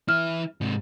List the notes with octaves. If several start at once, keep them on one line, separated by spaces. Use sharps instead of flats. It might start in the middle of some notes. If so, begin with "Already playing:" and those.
E3 E4 F6
G#2 C3